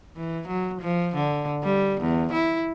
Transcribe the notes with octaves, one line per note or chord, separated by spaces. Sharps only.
E3
F#3
F3
D3
G3
E2
E4